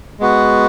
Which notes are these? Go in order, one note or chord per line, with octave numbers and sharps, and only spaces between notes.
G#3 B3 F#4